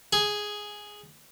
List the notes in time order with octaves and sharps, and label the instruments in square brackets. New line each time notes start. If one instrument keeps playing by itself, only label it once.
[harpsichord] G#4